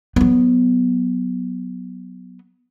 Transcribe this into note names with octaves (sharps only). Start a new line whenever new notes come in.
F#3 B3